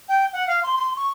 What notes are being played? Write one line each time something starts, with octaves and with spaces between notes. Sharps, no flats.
G5
F#5
F5
C6
C6
C#6